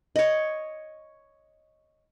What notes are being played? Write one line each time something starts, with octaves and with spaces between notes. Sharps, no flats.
C#5 D#5